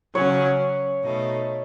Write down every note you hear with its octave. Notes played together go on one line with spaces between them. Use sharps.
C#3 F#3 C#4 C#5
B2 A3 D#4